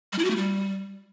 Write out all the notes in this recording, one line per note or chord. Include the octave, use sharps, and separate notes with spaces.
G3
E4
F#4
A3
G3